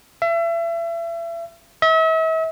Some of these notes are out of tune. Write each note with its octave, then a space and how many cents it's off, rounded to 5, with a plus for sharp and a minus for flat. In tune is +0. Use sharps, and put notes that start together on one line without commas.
E5 +35
E5 -40